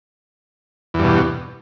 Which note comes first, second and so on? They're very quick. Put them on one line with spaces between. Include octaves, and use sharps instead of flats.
E2 G2 B2